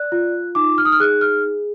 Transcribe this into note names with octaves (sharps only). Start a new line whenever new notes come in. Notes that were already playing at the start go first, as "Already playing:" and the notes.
Already playing: D5 F#6
F4
D#4 D6
F6
D#6
F6
G#4 F#6
F6